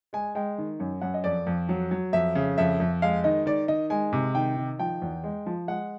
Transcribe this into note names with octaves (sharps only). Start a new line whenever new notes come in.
G#3 G#5
G#3 G5
D#3
F#2
F#2 F#5
D#5
F2 D5
F2
F#3
F#3
F2 E5
C#3
F2 E5
F2
G#3 F5
D#3 D#5
D#3 D5
D#3 D#5
G#3 G#5
C3
D#3 G5
D#3
F3 G5
E2
G#3
F3
G#3 F#5